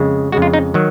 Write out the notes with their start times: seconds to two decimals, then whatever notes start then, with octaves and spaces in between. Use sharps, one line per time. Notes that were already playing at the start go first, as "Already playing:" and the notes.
Already playing: F2 C#3 G#3
0.32 F2 C#3 G#3 F#4
0.42 F4
0.53 D#4
0.74 D#3 F#3